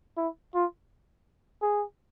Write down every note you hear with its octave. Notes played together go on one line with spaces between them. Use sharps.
E4
F4
G#4